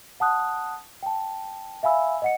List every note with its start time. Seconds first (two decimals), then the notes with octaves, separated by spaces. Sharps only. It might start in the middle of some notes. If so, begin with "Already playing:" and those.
0.20 F#5 A5 D#6 F#6
1.03 G5 A5
1.83 E5 F5 G#5 B5 E6
2.22 D#5 F#5 C#7